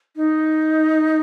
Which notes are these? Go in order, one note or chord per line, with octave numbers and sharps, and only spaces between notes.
D#4